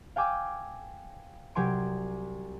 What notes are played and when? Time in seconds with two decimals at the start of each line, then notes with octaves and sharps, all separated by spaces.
0.16 F5 G5 G#5 D6 E6
1.55 C2 F#3 G4 G#5 C6 D7